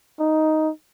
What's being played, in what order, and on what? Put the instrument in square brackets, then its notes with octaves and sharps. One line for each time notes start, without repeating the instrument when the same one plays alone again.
[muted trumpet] D#4